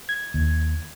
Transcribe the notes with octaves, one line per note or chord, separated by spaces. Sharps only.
G#6
D#2